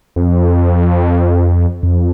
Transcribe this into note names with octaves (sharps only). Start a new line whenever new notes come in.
F2
F2